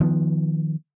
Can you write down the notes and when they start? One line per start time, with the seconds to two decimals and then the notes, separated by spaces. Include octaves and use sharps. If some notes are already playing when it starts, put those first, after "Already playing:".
0.01 D#3 F3 B3